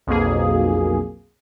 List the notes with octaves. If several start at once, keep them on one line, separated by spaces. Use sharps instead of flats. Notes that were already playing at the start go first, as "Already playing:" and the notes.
B1 F2 B2 A#3 G#4